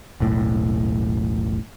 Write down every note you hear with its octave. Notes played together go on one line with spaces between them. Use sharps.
E1 B1 A2